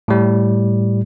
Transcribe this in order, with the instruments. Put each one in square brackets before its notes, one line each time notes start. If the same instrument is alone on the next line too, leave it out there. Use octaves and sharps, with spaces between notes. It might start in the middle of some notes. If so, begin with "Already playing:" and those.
[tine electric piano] A2 G3